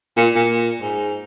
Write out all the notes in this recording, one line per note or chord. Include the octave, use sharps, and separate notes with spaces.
A#2
A#2
G#2